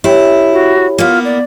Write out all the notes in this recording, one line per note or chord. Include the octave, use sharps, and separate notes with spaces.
E4 G4 C#5 G5
F#4
A#3 B3 F4
D5